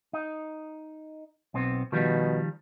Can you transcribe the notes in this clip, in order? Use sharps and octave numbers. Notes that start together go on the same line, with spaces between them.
D#4
B1 B3 C4
B2 D#3 F3 G3